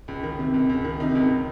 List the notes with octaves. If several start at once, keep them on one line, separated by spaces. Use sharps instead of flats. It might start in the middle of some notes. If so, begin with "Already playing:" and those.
C#2
D#3
C3
C#2
C#2
D#3
C3 D#4
C#2